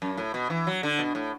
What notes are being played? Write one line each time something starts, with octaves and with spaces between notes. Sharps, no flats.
F#2
A2
B2
E3
F#3
D3
B2
A2